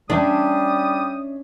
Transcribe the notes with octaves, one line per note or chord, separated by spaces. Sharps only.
G3 C#4 D4 D5 E5 D#6